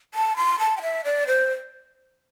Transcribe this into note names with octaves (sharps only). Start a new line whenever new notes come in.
A5
C6
A5
G5
E5
D5
C5